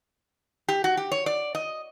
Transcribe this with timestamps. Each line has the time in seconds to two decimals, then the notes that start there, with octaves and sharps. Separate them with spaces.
0.68 G4
0.84 F#4
0.97 G4
1.12 C#5
1.26 D5
1.55 D#5